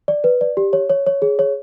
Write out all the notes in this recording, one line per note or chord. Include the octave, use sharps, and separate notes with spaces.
D5
B4
D5
G4
C#5
C#5
C#5
G#4
C#5